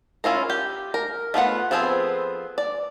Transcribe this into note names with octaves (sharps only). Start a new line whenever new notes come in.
C#4 E4 F4 A#4
G4
A#4
A3 B3 F4 F#5
F3 B3 C4 G#4 A4
D5